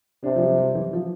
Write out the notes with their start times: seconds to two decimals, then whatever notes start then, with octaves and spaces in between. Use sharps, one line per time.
0.24 C3 D4
0.36 F3
0.42 G3
0.58 G3
0.75 E3
0.93 F3